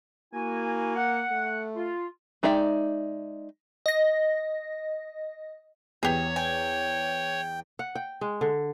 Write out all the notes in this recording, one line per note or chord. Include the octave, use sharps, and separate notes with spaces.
A#3 E4 F#4 G#5
F#5
A3
F4
G#3 D#4 D5 E5 G5
D#5 A#6
E2 G4 G#4 C#5
G5 G#5
F#5
G5
G#3
D3